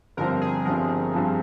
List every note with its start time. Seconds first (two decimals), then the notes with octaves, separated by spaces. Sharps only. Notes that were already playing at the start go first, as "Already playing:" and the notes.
0.17 G1 G2 F3 C4 A#4
0.41 G#4
0.65 G1 G2 F3 C4 A#4
1.13 G2 F3 C4